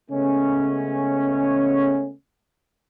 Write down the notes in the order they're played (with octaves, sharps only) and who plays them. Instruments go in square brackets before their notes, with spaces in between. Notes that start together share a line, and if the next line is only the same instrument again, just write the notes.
[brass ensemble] C#3 G#3 A3 B3 C#4